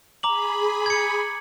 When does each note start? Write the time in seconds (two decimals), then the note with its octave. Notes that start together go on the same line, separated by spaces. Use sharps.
0.23 G#4 A#5 B5 D6 F#7
0.86 G#6 C#7